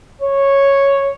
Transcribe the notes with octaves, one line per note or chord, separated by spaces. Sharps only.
C#5